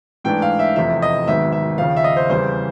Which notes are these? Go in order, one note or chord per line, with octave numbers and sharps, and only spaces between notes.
G#2 E3 A3 D4 G5
F5
E5
F1 E2 C3 F3 E5
D#5
G#1 G#2 D#3 F#3 B3 E5
E5
D#2 C#3 F3 F5
E5
D#5
C5
E2 C#3 E3 G3 C4 C5